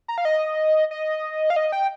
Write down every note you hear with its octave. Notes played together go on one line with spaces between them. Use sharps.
A#5
F5
D#5
D#5
F5
D#5
G5